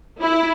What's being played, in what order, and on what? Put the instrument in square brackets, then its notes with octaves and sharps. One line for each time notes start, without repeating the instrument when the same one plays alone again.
[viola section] E4